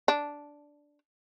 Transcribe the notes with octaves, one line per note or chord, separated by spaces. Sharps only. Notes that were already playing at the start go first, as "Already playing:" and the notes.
D4